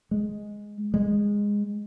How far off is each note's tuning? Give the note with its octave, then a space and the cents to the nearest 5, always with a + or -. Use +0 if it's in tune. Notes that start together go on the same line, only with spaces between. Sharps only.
G#3 +0
G#3 -15